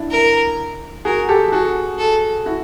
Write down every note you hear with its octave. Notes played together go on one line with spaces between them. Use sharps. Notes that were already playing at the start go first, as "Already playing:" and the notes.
Already playing: D4 E4
A#4
F#4 G#4 A#4
G4 A4
F#4 G#4 A4
A4
E4 F#4